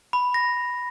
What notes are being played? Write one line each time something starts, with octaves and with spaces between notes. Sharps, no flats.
B5
A#6